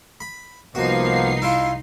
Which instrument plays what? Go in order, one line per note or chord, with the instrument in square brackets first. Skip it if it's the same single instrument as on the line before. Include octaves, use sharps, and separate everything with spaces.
[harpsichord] B5
[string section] C2 D#4 C7 [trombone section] F3 A#3 B3 [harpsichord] F#4
[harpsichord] E4 F4